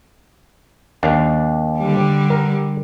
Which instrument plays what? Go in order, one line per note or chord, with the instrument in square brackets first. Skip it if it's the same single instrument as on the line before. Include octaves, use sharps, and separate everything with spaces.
[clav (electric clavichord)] D#2 D4 F5
[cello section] D3 G3
[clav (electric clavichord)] A#4